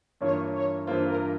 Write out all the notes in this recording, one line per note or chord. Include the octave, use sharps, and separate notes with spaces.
G2 E3 A#3 F4 C#5
C#5
G2 E3 A#3 F4 C5
A#4